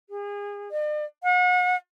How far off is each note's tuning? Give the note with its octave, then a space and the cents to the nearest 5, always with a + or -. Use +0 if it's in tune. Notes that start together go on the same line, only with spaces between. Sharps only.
G#4 -30
D5 +45
F#5 -40